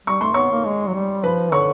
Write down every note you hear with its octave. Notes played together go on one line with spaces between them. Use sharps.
G3 C#6
A3 C6
B3 C#5 C#6
A#3
G#3
F#3
G3
F3 B4 B5
D3 C#5 C#6